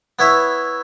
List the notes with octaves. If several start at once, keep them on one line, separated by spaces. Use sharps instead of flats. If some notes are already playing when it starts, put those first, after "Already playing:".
B3 E4 C#5 E5